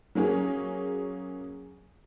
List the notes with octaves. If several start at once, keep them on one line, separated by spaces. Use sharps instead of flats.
F#3 A#3 C#4 G#4